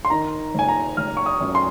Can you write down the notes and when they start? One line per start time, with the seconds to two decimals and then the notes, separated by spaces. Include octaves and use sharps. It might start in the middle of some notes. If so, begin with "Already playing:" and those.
0.05 C6
0.10 D#3 A#5
0.54 F#1 G#5
0.69 A#5
0.97 F#1 F6
1.17 C#6
1.26 D#6
1.41 F#2
1.55 C6